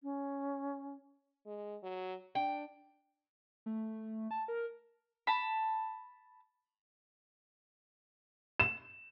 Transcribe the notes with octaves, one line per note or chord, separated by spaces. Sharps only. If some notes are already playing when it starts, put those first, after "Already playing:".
C#4
G#3
F#3
D4 G5
A3
A5
A#4
A5 B5
E7